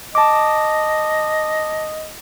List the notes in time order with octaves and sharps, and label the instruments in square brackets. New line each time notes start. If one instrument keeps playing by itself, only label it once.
[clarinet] D#5 [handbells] A5 D6